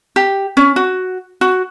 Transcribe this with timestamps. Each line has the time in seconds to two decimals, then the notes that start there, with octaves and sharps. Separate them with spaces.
0.16 G4
0.57 C#4
0.76 F#4
1.41 F#4